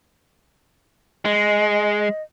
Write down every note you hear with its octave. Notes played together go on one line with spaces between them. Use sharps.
G#3 D#5